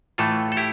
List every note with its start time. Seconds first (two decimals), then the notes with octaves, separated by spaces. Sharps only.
0.18 A2 E3 A3 F4 A4
0.52 A4
0.57 E4 G4